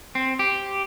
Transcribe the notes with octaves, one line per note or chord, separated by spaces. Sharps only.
C4
G4